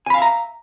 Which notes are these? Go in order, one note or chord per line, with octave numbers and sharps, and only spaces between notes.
E5 F5 G#5 A#5 B5